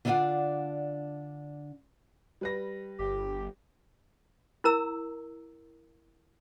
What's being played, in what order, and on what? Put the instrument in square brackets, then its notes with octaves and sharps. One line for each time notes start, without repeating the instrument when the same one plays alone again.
[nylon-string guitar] D3 D4 E4 F4 D5 F#5
[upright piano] G3 B4 A#6
[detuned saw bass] G1 [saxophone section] G4
[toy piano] E4 A#4 A#5 E6